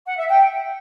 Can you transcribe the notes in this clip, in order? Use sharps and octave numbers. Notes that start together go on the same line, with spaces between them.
F#5
E5
G5